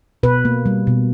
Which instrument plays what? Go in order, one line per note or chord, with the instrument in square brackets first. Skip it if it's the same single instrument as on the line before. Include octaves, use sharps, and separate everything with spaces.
[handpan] B2 B4
A#3
G3
B2